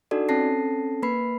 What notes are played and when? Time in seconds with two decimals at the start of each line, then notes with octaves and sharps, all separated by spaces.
0.11 D4 D#4 F#4 A4 D5
0.29 C4 C#4 A4 A5 A#6 C7
1.02 A#3 B4 B5 C7